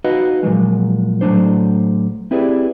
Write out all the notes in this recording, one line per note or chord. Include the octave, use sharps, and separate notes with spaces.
D#4 F#4 B4 D#5 F5 F#5
A#2 F3 F#3 G#3
A2 F#3 A3 D4 C5
C4 E4 G4 G#4 B4 D5